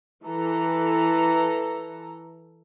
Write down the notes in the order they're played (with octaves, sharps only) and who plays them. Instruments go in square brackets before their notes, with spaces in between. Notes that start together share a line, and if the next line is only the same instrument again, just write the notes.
[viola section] E3 A4 A#5